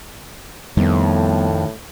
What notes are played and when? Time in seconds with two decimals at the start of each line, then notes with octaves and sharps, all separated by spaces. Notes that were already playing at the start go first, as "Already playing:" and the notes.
0.77 F2 A2 D#3 G3 B3